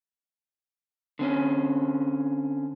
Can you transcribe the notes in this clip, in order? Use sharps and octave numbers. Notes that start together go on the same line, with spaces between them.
D3 C4 C#4